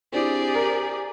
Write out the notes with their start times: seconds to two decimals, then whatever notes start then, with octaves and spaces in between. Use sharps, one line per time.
0.12 C4 D4 E4 G4 G#4 D5
0.55 A#4